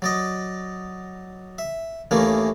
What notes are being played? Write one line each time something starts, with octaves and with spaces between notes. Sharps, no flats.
F#3 D5 D#5
E5
D#2 D#3 E3 A3 A#3 C#4